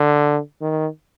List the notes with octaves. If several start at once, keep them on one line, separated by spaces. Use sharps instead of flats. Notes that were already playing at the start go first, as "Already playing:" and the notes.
Already playing: D3
D#3